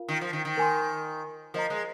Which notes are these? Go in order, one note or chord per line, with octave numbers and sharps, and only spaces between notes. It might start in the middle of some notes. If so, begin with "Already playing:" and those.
Already playing: F4 A#4 F5
D#3
F3
D#3
D#3
A#4 G#5 C6
F3 A#4 D#5 A#5
G#3